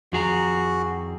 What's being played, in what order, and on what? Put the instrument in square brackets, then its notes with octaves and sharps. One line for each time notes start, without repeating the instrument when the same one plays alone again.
[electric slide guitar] F2 G#4 A#5 [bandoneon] F#4